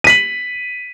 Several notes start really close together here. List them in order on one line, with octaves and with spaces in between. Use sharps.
D#7 B6 F#7